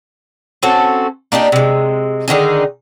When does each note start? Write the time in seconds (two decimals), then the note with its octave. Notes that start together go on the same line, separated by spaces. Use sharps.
0.63 C4 C#4 F#4 A4
1.32 A#3 D4 D#4 G4
1.52 C3 G#3
2.28 D3 D#3 D#4 G#4